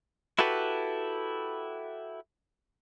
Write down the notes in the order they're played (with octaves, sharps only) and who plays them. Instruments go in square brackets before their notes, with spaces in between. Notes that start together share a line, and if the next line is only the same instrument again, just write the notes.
[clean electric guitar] E4 F#4 G4 A4 B4